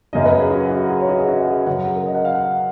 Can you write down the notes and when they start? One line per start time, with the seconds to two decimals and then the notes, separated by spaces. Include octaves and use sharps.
0.13 F#2 C#3 F#3 D#5
0.26 B4
0.39 G#4
0.51 F#4
0.71 F#4
0.89 G#4
0.99 C#5
1.09 F#4
1.19 G#4
1.28 F#4
1.47 G#4
1.66 F#2 C#3 F#3 F#5
1.86 G#4
1.96 A#4
2.05 D#5
2.15 F#5
2.25 F5
2.35 F#5